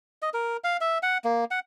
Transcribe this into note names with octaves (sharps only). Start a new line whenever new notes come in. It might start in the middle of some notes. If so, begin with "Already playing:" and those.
D#5
A#4
F5
E5
F#5
A#3
F#5